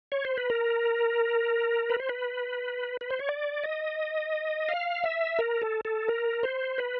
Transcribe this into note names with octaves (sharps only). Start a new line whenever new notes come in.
C#5
C5
B4
A#4
B4
C5
B4
B4
C5
C#5
D5
D#5
F5
E5
A#4
A4
A4
A#4
C5
B4